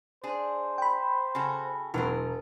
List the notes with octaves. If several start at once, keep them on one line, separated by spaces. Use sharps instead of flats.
D4 G#4 C5
G5 B5
C#3 F#4 A4
E1 F#3 C4 A#4